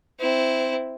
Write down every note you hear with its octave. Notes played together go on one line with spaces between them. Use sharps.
C4 E4